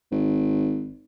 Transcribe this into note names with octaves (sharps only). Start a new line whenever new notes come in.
G#1